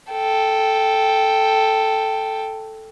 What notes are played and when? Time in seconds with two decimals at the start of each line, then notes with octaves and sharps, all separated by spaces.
0.11 A4 G5